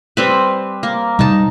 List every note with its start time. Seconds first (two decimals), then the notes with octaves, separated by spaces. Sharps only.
0.17 G3 C4 B4
0.83 A#3
1.19 C3 G3 D#4 A5